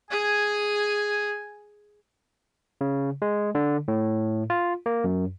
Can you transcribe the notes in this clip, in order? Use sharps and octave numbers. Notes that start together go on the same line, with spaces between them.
G#4 G#5
C#3
G#3
D3
A2
F4
A#3
F#2